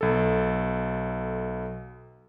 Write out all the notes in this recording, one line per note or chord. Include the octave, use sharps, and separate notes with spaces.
B1 A4